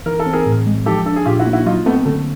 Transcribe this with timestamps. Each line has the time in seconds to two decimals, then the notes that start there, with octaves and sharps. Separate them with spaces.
0.06 E3 A#4
0.19 A4
0.26 C4
0.33 G#4 A#4
0.46 A2
0.66 G#3
0.86 F3 G4 A4
1.06 D4 A4
1.16 G#4
1.25 A#2 F4 G4
1.39 E4 F#4
1.46 A#3
1.53 E4 F#4
1.66 F#3 D#4 F4
1.86 A3 B3 C4
2.05 D3 A3